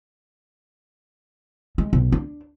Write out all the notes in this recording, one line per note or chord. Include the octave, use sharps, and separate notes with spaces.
G#3
B1
D4